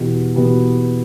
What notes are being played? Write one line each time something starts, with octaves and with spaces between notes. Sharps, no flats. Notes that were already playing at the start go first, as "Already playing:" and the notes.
Already playing: E2 B2 B3 G4
E2 B2 B3 G4